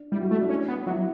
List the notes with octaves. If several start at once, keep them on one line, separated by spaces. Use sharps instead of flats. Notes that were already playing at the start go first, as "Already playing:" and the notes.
Already playing: D4
G3 E4
F#4
A3 E4
D4
C#4
B3
F#3 E4